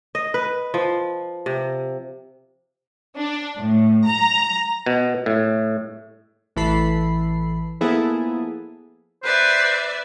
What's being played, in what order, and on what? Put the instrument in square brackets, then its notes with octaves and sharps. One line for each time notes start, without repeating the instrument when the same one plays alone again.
[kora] D#5
B4
F3
C3
[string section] D4
A2
A#5
[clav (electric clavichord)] B2
A2
[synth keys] A1 E3 A4 B5 C7
F3 A#3 B3 E4 G#4 A4
[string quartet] B4 D5 E5 [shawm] C5